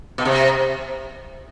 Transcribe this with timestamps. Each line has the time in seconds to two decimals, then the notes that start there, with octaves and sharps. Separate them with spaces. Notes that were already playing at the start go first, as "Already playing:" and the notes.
0.18 B2
0.25 C3